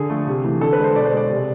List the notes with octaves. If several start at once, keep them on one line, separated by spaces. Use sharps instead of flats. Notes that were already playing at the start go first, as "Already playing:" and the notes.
Already playing: D3 G#4
F3 A3
C3
E3 A3
D3 A4
B4
G#3
C5
B2 D5
C5
G#3 D5
C3